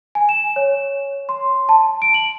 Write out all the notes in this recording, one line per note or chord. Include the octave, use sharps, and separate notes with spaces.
G#5
E7
C#5
C6
A5
D7
F#7